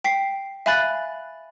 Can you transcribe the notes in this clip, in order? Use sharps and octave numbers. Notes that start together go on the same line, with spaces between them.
G5 B6 C7
E5 F5 G#5 B5 F#6 A6